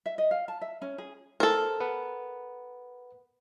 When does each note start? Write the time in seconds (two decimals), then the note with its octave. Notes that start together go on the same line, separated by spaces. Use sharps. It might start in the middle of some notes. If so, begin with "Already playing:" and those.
0.06 E5
0.18 D#5
0.31 F5
0.48 A5
0.61 E5
0.82 C#4
0.98 G#4
1.40 A4 A#4 C5
1.80 B4 F#5